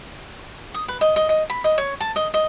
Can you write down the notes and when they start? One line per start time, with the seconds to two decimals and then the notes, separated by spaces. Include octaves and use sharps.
0.74 D#6
0.88 B4
1.01 D#5
1.16 D#5
1.29 D#5
1.50 B5
1.64 D#5
1.78 C#5
2.00 A5
2.16 D#5
2.34 D#5